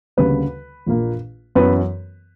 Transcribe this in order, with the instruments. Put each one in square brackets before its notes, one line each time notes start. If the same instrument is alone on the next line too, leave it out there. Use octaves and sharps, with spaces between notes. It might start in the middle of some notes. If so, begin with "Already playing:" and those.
[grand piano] D2 C#3 G3 A#3 B4
A#1 A#2 A#3
F#2 E3 B3 B4